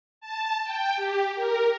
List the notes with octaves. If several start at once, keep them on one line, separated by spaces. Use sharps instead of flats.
A5
G5
G4
A#4